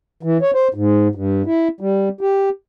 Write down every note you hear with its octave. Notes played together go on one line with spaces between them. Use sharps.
E3
C#5
C5
G#2
G2
E4
G3
G4